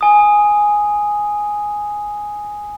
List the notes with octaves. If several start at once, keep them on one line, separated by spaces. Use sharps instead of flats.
G#5 D#6